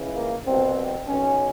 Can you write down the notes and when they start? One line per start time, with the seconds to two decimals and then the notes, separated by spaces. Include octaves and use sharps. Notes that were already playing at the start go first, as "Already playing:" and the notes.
Already playing: C#2 C#3 E3
0.15 A#3
0.46 C2 B2 C4
1.08 B1 B2 C#4